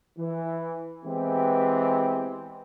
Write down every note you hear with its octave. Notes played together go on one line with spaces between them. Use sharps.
E3
E3 G#3 B3 C4 G4